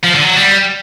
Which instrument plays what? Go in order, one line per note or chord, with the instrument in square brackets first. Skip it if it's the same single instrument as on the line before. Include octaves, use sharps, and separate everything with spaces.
[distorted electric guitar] F3
D3
F#3
G3